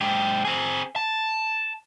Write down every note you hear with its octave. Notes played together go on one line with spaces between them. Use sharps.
G#2 G4
C4 G#4
A5